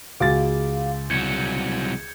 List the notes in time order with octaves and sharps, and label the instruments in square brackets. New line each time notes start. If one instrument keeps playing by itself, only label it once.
[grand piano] C#2 G#4 A6 [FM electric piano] F#4 F5 D6
[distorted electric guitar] C2 F#3 [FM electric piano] G6 G#6 C#7